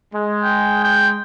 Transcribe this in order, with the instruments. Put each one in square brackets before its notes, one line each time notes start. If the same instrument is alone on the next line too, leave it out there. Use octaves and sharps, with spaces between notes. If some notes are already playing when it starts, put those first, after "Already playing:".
[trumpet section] G#3
[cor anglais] G5
G5